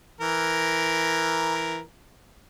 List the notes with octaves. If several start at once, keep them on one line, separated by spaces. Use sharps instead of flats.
E3 A#4